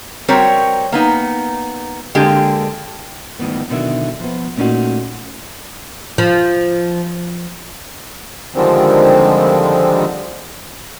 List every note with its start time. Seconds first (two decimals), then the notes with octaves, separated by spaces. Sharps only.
0.28 G3 C4 F#4 A#4 C#5
0.92 A#3 B3 D#4
2.15 D3 G#3 A#3 C4 G4
3.39 D2 G2 D#3 E3 B3
3.69 B2 D3 D#3 F#3 E4 E5
4.20 F3 B3
4.57 A#2 A3 C#4 D#4 F4 F#4
6.18 F3
8.55 D3 D#3 F3 G3 G#3 C4